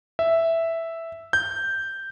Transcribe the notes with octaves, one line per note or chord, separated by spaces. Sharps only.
E5
G6